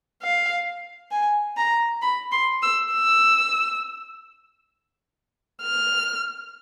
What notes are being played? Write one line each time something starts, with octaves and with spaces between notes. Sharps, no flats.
F5
G#5
A#5
B5
C6
E6
E6
F6